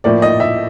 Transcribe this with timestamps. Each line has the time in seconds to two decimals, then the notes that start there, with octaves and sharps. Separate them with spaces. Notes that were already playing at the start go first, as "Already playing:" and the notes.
0.04 A2 F3 A#3 D5
0.22 D#5
0.40 E5